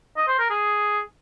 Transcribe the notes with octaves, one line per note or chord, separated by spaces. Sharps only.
D#5
C5
A#4
G#4